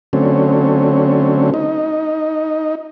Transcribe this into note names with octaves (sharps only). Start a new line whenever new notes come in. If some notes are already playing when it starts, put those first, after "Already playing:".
D3 F#3 A3 C4 C#4
D#4